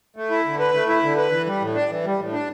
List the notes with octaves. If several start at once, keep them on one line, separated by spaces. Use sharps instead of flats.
A3
E4
D3
B4
A3
E4
D3
B4
E3
G3
A2
D4
E3
G3
A2
D4